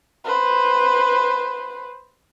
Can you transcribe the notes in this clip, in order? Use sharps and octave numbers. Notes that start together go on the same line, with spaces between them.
B4 C5